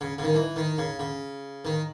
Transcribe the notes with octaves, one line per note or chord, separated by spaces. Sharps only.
C#3
C#3
D#3
E3
D#3
C#3
C#3
D#3